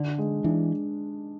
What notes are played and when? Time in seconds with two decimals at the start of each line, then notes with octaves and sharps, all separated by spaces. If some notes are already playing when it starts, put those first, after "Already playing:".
Already playing: D3 D4
0.18 G#3
0.44 E3 D4